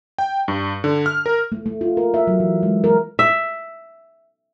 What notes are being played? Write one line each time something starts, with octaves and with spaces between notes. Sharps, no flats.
G5
G2
D3
F6
A#4
A3
A3
F4
A#4
E5
F#3
E3
G#3
A#4
E5